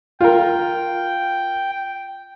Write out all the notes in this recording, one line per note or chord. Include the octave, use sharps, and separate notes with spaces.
F4 A#4 G5